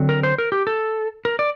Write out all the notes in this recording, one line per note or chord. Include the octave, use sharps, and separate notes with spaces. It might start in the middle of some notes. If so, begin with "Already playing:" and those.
Already playing: D3 F#3 C4
A#4
C5
A#4
G4
A4
A#4
D5